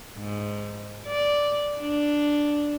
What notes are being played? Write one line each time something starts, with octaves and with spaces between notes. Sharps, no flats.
G#2
D5
D4